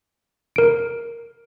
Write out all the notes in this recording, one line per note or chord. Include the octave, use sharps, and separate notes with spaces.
A#4 D7